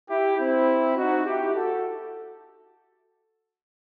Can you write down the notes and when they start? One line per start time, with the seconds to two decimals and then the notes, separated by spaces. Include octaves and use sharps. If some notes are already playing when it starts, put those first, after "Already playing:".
0.09 E4 G4
0.38 C4 E4
0.96 D#4 F#4
1.26 E4 G4
1.55 F#4 A4